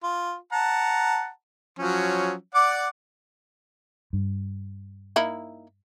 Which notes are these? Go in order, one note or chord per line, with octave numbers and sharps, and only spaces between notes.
F4
F#5 A5 A#5
F3 F#3 C#4
D5 F#5 D6
G2
A#3 D#4 E4